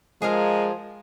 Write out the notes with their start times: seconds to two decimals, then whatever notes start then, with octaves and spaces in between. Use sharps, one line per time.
0.22 F3 G#3 G#4 A#4 F5